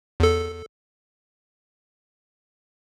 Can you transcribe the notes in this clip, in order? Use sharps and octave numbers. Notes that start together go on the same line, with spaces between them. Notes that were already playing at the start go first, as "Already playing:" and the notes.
E2 A4